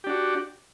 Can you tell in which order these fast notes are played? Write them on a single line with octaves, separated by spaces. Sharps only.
G4 D4 F#4